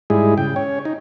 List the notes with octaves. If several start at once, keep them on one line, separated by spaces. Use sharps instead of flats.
G#2 G3 G#3 E4 G#4
C#3 G5
C#4 C#5
D#4